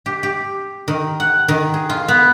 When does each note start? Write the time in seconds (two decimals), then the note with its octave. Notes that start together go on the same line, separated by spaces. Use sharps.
0.06 G4
0.23 G4
0.88 D#3
1.20 F#5
1.48 D#3
1.74 G#4
1.90 F4
2.08 B3